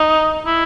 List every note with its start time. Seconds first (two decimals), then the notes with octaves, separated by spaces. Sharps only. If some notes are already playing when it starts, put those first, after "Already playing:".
Already playing: D#4
0.46 E4